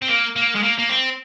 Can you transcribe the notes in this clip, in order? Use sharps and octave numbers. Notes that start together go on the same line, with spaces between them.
C4
A#3
A#3
G#3
A#3
A#3
C4